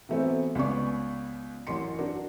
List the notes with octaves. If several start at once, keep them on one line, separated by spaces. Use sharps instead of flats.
E3 F#3 A3 B3 C4
C#2 B3 C#4 D5 C#6
A1 F#2 C6 C#7
D4 F#4 A#4